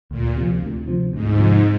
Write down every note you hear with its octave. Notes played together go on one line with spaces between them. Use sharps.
D2 A#2
C3 F3
D2
C3 F3
D2 G#2
C3 F3